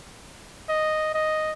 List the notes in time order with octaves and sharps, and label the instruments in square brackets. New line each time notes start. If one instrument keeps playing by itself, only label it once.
[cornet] D#5
D#5